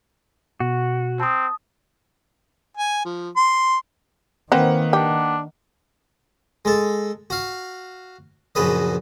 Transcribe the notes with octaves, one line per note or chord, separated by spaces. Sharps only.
B2 F#4
C4 A5 B5 D#6
G#5
F3
C6
D#3 A#3 C4 D#4 B4 C5 F#5
D4 G4
G#3 A4
F#4 F5
A#1 F#2 C#3 B4 D#5